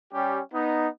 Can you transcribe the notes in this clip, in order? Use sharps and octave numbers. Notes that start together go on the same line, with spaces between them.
G3 C#4 G4
B3 D#4